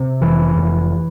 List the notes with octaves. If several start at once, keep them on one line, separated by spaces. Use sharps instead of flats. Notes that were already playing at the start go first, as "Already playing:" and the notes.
Already playing: C3
F1 E3
F1